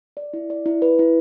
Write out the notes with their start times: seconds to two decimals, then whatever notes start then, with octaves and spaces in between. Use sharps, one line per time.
0.17 D5
0.33 E4
0.50 D5
0.66 E4
0.82 B4
0.99 E4